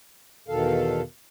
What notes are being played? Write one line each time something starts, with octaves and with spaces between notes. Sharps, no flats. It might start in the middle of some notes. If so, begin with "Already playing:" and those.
E2 B2 D#3 A4 F5